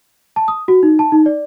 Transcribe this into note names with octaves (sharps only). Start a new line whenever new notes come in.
A5
D#6
F#4
D#4
A5
D#4
D5